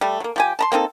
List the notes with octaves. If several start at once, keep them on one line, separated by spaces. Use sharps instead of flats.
G3 A3
F#3 A#3
F3 G4 G#5
A5 A#5 C6
A#3 C4 D#4 A4